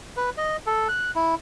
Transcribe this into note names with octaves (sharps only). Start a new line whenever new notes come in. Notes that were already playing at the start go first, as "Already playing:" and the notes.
B4
D#5
A4
F#6
E4